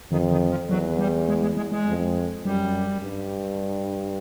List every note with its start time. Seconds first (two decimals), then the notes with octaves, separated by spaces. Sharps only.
0.11 F2 D#3
0.31 D#3
0.50 F3
0.70 E2 F#3
0.99 G3
1.29 G#3
1.42 G#3
1.57 G#3
1.72 G#3
1.86 F2
2.45 F#2 G3
3.03 G2